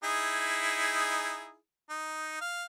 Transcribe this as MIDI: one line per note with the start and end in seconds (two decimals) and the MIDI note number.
0.04 1.56 63
0.04 1.56 64
0.04 1.56 68
1.90 2.40 63
2.41 2.64 77